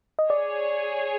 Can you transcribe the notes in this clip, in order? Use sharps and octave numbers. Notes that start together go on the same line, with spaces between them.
D#5
G#4 C#5 D5